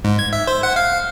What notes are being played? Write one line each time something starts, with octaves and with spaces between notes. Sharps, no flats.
G#2
G#6
E5
C5
F#5
F5